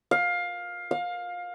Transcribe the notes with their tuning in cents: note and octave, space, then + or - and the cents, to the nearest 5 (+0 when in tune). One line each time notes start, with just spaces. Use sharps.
F5 +15
F5 +25